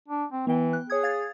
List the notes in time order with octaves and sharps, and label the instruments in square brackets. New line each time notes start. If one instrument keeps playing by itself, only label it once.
[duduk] D4
C4
[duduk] E3 [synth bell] B3 G5
[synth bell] F#6
[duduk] G#4 [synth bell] C#5 D#6 G#6
[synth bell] F5 G#6 A6